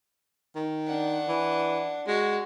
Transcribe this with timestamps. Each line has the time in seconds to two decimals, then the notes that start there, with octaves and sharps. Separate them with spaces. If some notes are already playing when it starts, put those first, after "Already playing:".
0.55 D#3
0.87 D4 F#5
1.28 E3
2.08 G#3 F#4